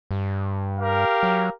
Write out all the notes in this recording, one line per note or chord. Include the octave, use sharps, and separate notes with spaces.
G2
G4 A#4 F5
F#3